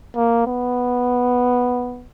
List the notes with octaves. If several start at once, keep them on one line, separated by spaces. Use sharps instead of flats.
A#3
B3